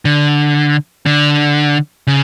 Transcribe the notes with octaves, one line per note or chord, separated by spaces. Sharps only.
D3
D3
C#3